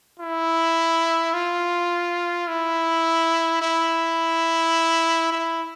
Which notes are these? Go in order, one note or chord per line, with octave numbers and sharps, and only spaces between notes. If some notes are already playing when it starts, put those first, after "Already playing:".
E4
F4
E4
E4
E4